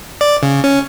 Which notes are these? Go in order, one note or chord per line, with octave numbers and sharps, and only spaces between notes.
D5
C#3
C#4